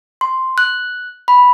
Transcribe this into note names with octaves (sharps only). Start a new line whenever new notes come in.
C6
F#6
B5